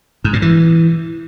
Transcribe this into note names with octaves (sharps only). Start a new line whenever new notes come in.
G#2
A#2
E3